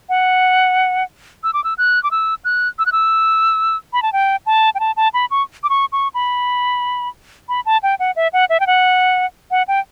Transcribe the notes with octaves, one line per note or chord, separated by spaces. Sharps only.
F#5
E6
D6
E6
F#6
D6
E6
F#6
E6
F#6
E6
B5
A5
G5
A5
G5
A5
A5
B5
C#6
D6
C#6
C#6
B5
B5
A5
G5
F#5
E5
F#5
E5
G5
F#5
F#5
G5